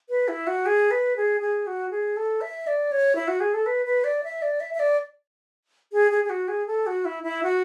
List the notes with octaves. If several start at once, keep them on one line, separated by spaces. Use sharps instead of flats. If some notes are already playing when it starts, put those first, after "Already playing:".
B4
E4
F#4
G#4
B4
G#4
G#4
F#4
G#4
A4
E5
D5
C#5
E4
F#4
G#4
A4
B4
B4
D5
E5
D5
E5
E5
D5
G#4
G#4
G#4
F#4
G#4
A4
F#4
E4
E4
F#4